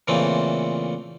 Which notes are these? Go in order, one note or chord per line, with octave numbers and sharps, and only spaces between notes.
A#2 C#3 E3 A3 C4